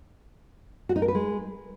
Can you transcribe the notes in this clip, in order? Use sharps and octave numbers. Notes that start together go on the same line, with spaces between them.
F#4
D#4
A#4
B4
G#3